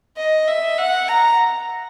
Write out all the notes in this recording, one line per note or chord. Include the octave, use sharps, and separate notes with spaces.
D#5
E5
F#5
A#5